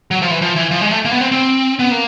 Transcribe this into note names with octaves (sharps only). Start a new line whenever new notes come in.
F#3
F3
E3
F3
E3
F3
G#3
A3
A#3
B3
C4
C4
B3
A#3